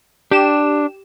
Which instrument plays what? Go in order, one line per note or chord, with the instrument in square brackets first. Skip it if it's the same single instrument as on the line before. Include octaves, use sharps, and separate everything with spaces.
[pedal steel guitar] D4 [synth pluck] G4 E7